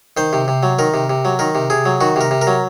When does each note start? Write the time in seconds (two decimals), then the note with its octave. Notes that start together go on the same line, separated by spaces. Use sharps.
0.17 D#3 C5
0.33 C3
0.48 C3
0.63 F#3
0.79 D#3 A#4
0.94 C3
1.10 C3
1.25 F#3
1.39 D#3 A#4
1.55 C3
1.70 C3 G#4
1.86 F#3
2.01 D#3 F#4
2.16 C3 A#4
2.31 C3
2.41 A#4
2.47 F#3